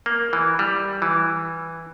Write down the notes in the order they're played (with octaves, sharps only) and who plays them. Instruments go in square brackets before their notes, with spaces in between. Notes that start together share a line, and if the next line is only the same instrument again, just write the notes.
[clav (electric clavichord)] A#3
E3
G3
E3